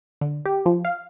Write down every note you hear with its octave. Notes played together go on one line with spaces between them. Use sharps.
D3
G4
F3
F5